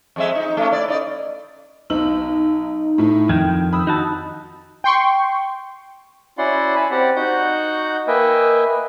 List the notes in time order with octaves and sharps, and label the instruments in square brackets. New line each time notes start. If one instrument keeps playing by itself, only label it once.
[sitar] F2 G#3 E5
D#4
A3 C#4
E4 D5
D#4 D5
[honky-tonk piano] B1 E6 F#7 [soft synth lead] D#4
[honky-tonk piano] A2 E4
[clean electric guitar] F2 D#3 [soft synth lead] G5 [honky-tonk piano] G#6
[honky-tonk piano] B5 D#6 [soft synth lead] E6
[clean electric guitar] D#4 F#4 A5
[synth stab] G5 C6 C#6
[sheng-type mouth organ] C#4 E4 F#4 D5 F#5 C6
G#5 A5 B5
C4 G4 D5 F#5
D#4 F#4 F#5 G6
A#3 B4 D#5 E5 G5 G#5